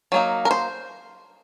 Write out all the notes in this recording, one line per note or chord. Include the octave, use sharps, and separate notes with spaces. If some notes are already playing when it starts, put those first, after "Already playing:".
F#3 A#3 D#4
A#4
C5